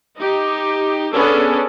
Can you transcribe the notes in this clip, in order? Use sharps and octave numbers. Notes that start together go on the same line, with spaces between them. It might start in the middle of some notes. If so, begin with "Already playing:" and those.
D#4 G4
B3 C#4 D4 G#4 A4